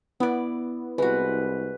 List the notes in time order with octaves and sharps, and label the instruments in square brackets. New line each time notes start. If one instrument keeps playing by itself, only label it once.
[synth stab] B3 [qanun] E4 D5
[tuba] C2 [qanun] G#3 F#4 [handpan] B4